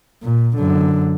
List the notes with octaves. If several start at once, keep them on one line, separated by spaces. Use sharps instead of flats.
A#2
F#2 D3